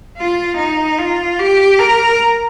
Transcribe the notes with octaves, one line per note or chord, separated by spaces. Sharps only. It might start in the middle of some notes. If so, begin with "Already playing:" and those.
F4
D#4
F4
G4
A#4